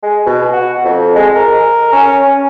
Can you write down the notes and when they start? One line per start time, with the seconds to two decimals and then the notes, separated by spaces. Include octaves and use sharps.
0.03 G#3
0.26 B2
0.53 F#4
0.85 F2
1.16 G#3
1.36 A#4
1.92 C#4
2.24 C#4